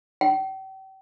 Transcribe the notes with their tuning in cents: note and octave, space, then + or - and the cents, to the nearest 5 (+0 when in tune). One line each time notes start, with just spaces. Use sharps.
G5 -40